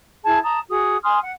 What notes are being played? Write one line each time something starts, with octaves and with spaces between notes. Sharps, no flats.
E4 G#4 A5 G#6
A5 A#5 D#6
F#4 G#4 D#6
G#5 C6 D#6 F6
F#5